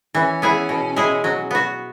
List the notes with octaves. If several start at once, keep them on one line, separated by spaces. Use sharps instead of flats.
E3 C#4
B3 E4 G#4
B2
G#3 E4 G#4
F#3
B3 F#4